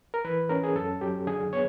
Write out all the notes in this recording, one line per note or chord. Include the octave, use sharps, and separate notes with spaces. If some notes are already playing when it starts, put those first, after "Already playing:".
A#4
E3 B4
C#4 A#4
G#4
F#2 A4
F#3 G4
D3 G#4
B3 C#5